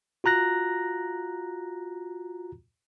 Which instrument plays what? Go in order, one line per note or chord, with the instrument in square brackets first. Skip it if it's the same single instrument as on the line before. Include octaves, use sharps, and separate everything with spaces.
[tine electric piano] F4 F#4 A#5 F#6 A#6